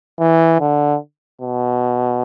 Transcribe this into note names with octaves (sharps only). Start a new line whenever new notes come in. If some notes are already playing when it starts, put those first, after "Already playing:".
E3
D3
B2